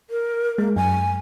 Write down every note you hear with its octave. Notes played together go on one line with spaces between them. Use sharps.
A#4
G#3 A#3
F#2 G#5